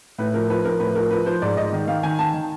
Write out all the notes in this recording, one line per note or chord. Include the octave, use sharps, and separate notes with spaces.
A2 B4
F3 A#4
F3 B4
F3 A#4
A2 B4
F3 A#4
F3 B4
F3 C5
G#2 D5
G#2 D#5
D#3
D#3 F5
D#3 G#5
D#3 A5
D#3